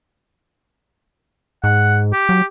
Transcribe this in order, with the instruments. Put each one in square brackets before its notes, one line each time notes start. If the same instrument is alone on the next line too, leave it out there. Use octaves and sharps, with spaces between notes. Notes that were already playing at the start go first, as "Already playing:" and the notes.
[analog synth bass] G#2 [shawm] F#5
[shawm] G4
[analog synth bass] F#3